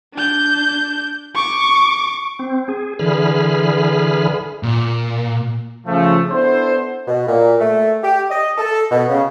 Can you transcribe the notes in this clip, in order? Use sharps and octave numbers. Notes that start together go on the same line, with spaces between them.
D4 G6
C#6 D6
C4
G#4
D3 E3 G#4 B5 F6
A#2
C#3 F3 A3
B3 D4 E4 A4 C5
B2
A#2
A3
G4
D#5
A4
B2
C#3